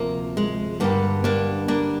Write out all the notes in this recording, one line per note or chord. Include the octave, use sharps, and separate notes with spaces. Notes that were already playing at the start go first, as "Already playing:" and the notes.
Already playing: D2 C3 F3 A#3
G#3
G2 D3 G3 A#3
A#3 D4
A#3 D4